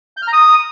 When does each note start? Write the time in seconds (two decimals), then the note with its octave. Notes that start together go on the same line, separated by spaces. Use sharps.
0.17 G6
0.22 F6
0.27 A#5
0.33 D#6